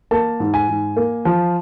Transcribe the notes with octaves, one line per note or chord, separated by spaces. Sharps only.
A#3 A5
G#2
G#5
G#2
A#3
F3